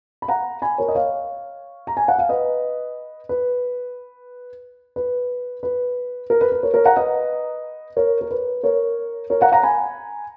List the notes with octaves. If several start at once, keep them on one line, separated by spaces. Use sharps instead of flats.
B5
F#5 A#5
G#5 B5
A#4 C#5
D#5
C#5 F5
A#5
G#5
F#5
F5
B4 D#5
B4
B4
B4
A#4
B4
B4
A#4 C#5
A#4 C#5
F#5 A#5
B4 D#5
A#4 C#5
A#4
B4
A#4 C#5
A#4 C#5
F#5 A#5
F#5 A#5
G#5 B5